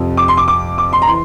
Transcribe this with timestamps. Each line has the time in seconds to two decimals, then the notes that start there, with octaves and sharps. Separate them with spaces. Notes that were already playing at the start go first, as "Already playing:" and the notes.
Already playing: F2 C3 F3
0.17 D6
0.28 C6
0.37 D6
0.48 D6
0.78 D6
0.93 C6
1.02 A#5
1.08 E3 C6